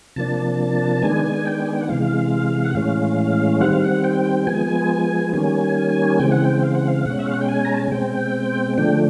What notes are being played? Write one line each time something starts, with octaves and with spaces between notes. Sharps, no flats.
C3 F3 A#3 D4 A5
D#3 G#3 B3 D4 G#5
G5
G#5
G5
F#5
C3 E3 G#3 F5
F#5
A2 E3 G#3 C#4 F5
D#3 G3 C4 F#5
F5
F#5
G5
F3 G#3 B3 G#5
D#3 G3 A#3 C#4 G#5
C#3 E3 G#3 C4 G5
F#5
G5
F5
F#5
F5
B2 G#3 C#4 F#5
E5
F5
F#5
G5
G#5
A#5
A5
G#5
B2 G#3 C4 G5
D3 F3 A3 D4 G5